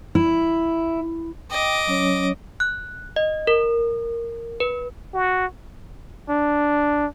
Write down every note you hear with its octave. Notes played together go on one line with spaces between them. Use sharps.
E4
D#5 G5 D6
F#3 C#4 C#5
F#6
D#5
A#4
B4
F#4
D4